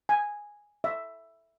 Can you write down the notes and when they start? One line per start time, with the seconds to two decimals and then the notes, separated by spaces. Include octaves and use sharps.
0.09 G#5
0.84 E5